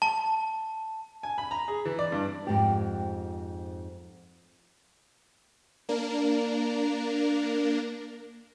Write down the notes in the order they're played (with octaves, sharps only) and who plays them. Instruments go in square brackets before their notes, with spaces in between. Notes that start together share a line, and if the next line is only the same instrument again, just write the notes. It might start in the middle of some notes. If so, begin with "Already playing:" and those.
[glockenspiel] A5
[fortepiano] G#5
B5
A#5
G#4
E3
D5
G2
[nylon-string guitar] F2 G#2 C4 G4
[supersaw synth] A#3 D4 A#4